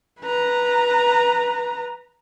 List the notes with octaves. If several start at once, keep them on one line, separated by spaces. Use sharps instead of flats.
B4 A#5